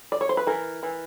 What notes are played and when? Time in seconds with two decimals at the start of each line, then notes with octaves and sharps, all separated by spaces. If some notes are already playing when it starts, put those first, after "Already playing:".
0.12 D5
0.21 C#5
0.29 C5
0.37 B4
0.47 E3 A#4
0.83 E3